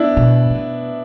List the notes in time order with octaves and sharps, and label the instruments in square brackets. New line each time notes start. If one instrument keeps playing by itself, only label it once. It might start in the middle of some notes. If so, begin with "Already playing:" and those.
Already playing: [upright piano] B3 D4 E4
[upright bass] B2
C3
B2